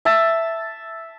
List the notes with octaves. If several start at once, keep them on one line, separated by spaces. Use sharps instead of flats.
E5 A5